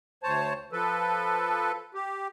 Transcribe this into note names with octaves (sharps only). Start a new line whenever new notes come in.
D2 C5 C#5 A5
F3 A4 B4
G4